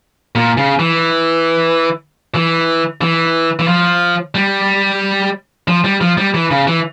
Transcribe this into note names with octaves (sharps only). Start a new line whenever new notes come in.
A#2
C#3
E3
E3
E3
E3
F3
G3
F3
G3
F3
G3
E3
C#3
E3